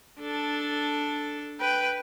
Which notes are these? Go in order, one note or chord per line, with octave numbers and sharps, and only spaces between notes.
D4 A4
B4 G5